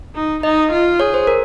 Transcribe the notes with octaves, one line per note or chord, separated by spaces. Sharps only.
D#4
D#4 D#5
F4
G#4 C#5
C5
A#4